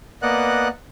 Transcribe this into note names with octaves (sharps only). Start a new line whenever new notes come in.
A#3 B3 D5 D#5 F#5 F#6